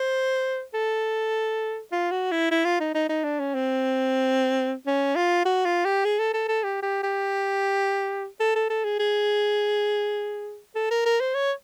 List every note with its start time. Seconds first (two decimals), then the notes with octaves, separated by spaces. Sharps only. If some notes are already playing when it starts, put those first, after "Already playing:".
Already playing: C5
0.74 A4
1.92 F4
2.11 F#4
2.31 E4
2.51 E4
2.65 F4
2.80 D#4
2.94 D#4
3.09 D#4
3.24 D4
3.39 C#4
3.54 C4
4.86 C#4
5.15 F4
5.45 F#4
5.65 F4
5.85 G4
6.05 G#4
6.19 A4
6.34 A4
6.48 A4
6.63 G4
6.82 G4
7.03 G4
8.40 A4
8.55 A4
8.70 A4
8.84 G#4
8.99 G#4
10.75 A4
10.91 A#4
11.05 A#4
11.20 C5
11.34 C#5